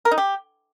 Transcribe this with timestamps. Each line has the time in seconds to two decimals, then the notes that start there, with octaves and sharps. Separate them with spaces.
0.05 A#4
0.11 D#4
0.18 G4